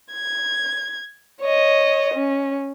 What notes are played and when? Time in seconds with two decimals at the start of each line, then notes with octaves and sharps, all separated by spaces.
0.13 G#6
1.41 C#5 D#5
2.14 C#4